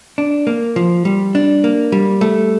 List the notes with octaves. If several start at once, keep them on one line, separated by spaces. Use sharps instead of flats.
D4
A#3
F3
G3
D4
A#3
G3
A3